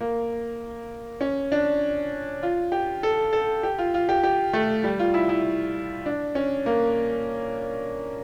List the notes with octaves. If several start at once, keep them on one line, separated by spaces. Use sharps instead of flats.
A#3
C#4
D4
F4
G4
A4
A4
G4
F4
F4
G4
G4
A3
G3
F4
E4
E4
D4
C#4
A#3